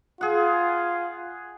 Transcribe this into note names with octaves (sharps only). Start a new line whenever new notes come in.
F4 G#4 F#5